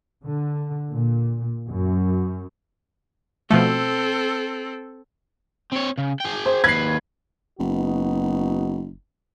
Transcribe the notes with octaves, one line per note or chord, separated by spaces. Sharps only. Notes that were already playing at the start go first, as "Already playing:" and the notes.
D3
A#2
F#2
B2 F3 A3 C4 A4
C4 C#5
C#3
G#4 G5
C5
D#2 B4 G#6 C7
F#1 B3 D#4 F#4